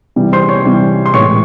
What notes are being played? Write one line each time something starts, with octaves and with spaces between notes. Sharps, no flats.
C3 E3 G3
C5 C6
C#5 C#6
C3 E3 G3
C6
A2 E3 G#3 C#5 C#6